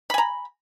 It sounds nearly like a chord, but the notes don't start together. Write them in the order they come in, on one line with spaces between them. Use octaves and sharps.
B5 G#5 A#5